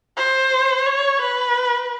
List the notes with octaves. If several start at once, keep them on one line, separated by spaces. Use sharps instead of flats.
C5
C#5
B4